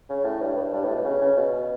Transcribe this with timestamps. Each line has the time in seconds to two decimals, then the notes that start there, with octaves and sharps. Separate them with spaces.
0.09 C#3
0.24 A2
0.41 G2
0.57 G2
0.73 G2
0.84 A2
0.94 B2
1.05 C#3
1.21 C#3
1.37 B2